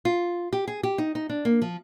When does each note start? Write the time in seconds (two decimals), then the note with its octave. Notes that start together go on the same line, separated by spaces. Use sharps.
0.05 F4
0.53 G4
0.68 G#4
0.83 G4
0.98 D#4
1.15 D#4
1.30 D4
1.45 A#3
1.62 F3